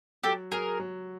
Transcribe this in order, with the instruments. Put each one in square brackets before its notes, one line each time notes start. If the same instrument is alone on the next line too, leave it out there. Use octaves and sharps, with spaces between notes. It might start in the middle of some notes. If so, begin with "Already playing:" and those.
[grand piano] F#3 [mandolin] G4 A4
[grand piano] F#3 [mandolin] G#4 A#4
[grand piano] F#3